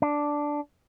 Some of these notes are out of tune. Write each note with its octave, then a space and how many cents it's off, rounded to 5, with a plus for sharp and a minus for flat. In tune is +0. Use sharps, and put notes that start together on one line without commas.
D4 +0